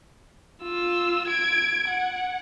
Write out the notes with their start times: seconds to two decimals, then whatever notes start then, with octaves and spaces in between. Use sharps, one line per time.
0.63 F4 E6
1.28 G#6 D7
1.88 F#5